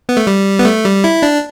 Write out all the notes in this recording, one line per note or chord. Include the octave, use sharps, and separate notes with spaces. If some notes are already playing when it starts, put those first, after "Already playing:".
B3
A3
G3
B3
A3
G3
E4
D4